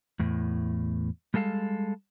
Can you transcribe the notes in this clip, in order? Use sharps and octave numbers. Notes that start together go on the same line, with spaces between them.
E2 A2
G3 G#3 A4 F5 A5